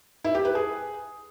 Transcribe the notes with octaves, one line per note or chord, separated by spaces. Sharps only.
E4
G4
B4
G#4